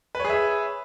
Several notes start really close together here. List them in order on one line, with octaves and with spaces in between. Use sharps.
B4 C#5 G#4 E5